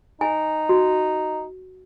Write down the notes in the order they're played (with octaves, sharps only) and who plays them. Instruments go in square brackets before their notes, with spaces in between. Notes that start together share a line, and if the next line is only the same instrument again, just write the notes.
[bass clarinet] D#4 [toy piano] G#5
[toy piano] F#4